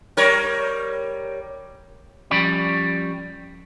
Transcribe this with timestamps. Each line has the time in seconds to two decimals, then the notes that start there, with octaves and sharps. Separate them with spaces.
0.17 G3 A#4 C#5
2.31 F3 G3 C#4 D5 B5